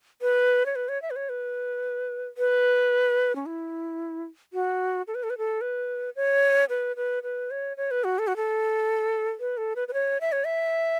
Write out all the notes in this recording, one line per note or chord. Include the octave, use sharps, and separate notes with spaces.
B4
C#5
B4
C#5
E5
B4
C#5
B4
B4
C#4
E4
F#4
A4
B4
A4
B4
A4
B4
C#5
B4
B4
B4
C#5
C#5
B4
F#4
A4
F#4
A4
B4
A4
B4
B4
C#5
E5
C#5
E5